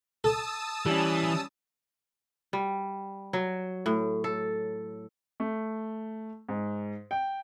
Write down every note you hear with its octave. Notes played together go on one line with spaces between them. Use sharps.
A4 A5 D#6 E6
E3 G3 C#4
G3
F#3
A2
A4
A3
G#2
G5